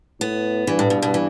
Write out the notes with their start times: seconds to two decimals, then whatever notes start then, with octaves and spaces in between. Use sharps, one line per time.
0.20 A2 B3
0.67 G2 E3
0.79 A2
0.90 B2
1.02 B2
1.14 E3